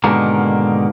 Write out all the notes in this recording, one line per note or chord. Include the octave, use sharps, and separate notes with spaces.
G#2 B2 D3 D#3 A#3